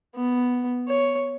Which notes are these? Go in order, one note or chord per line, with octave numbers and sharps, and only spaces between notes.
B3
C#5